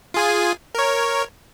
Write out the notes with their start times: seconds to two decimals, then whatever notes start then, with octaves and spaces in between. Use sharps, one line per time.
0.14 F4 G#4 G#5
0.75 A#4 C#5